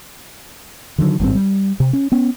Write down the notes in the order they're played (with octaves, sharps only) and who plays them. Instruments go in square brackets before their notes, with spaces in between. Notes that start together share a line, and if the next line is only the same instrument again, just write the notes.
[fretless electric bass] D3 D#3 F3 F#3
G#1 G2 C#3 C4
G3
C3
C#4
B3 C#4